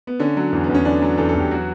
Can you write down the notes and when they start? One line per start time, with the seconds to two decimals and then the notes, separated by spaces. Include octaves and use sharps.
0.07 B3
0.19 D3 C#4
0.37 F#3
0.53 E2
0.64 B3
0.70 E2 C#4
0.85 D3 D4
1.02 F#3
1.18 E2 A4
1.29 A4
1.35 E2
1.40 G4
1.51 F#3 F#4